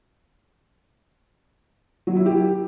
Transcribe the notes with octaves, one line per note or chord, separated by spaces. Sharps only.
F#3
E4
G4